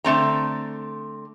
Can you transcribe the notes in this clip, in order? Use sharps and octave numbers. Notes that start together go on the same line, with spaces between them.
D3 A3 C4 A#5